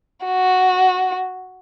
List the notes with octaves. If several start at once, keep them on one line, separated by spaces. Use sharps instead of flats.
F#4